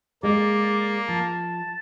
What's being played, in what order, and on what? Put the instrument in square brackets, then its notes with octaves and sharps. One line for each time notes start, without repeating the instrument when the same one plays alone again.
[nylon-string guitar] G#3 [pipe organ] A#3 [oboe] D5
[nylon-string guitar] F3 [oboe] A5